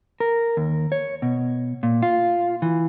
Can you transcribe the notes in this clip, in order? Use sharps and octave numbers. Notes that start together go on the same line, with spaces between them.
A#4
D#2
C#5
B2
A#2
F4
E3